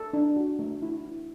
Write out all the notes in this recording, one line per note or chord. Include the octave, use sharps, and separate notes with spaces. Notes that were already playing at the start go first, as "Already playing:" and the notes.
Already playing: A4
D4
F#4
A3
E4
E4